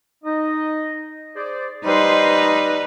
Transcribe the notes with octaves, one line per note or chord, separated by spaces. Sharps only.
D#4 D#5
G#4 C5 D5
G3 D#4 B4 C5 D#5 C6